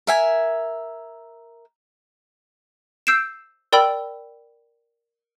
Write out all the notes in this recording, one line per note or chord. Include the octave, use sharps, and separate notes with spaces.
A#4 E5 G#5
E6 G6 C7 D7 E7
A#4 D5 G5 B5 E6